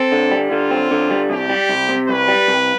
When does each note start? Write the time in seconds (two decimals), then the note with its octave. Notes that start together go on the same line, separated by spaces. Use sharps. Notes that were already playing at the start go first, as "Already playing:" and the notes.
Already playing: C4 A4
0.12 D3
0.31 G3
0.51 D3 F4
0.71 C4
0.91 D3
1.11 G3
1.30 C2 G4
1.49 G3
1.69 C2
1.89 C3
2.08 C2 B4
2.28 G3
2.48 C2